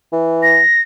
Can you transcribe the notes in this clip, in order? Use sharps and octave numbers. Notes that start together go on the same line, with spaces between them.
E3
A#6